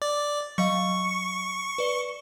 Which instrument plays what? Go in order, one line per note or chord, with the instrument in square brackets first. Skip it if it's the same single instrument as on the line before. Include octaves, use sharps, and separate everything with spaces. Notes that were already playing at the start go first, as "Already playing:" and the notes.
[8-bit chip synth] D5
[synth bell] F#3 D#5 F5 [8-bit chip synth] C#6
[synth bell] B4 D5 G7